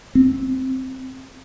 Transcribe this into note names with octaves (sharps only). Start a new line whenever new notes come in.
C4